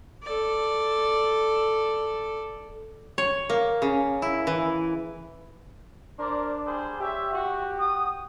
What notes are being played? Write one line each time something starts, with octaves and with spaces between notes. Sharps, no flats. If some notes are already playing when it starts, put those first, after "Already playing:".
A4 D5
C#5
A#3
C#3
E4
E3
D4 A#4 C5 D5
G3 G#4 C5
G4 C#5 E5
F#4
F#4 D#6